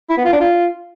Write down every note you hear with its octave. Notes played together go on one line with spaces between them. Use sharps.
E4
B3
F4
D4
F4